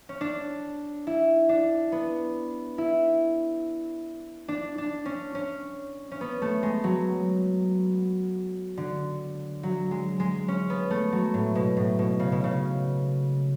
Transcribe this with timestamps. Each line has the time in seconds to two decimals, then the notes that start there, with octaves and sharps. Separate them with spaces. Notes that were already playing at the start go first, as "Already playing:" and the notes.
0.09 C#4
0.21 D4
1.07 E4
1.49 D4
1.92 B3
2.78 E4
4.48 D4
4.78 D4
5.06 C#4
5.35 C#4
6.11 C#4
6.21 B3
6.42 A3
6.63 G#3
6.84 F#3
8.77 D3
9.63 F#3
9.91 G#3
10.20 G#3
10.48 C#4
10.70 B3
10.91 A3
11.13 F#3
11.34 A2
11.55 B2
11.77 A2
11.99 B2
12.19 C#3
12.32 B2
12.44 C#3